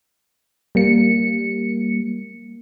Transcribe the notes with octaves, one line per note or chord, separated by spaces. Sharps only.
G3 A#3 C#7